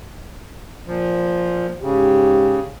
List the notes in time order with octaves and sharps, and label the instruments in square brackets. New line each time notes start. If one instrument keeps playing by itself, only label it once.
[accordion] A#2 F3
[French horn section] G#2 G4 [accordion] C#3